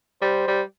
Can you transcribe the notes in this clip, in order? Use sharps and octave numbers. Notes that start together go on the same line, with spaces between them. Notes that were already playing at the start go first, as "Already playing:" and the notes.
G3 C5
G3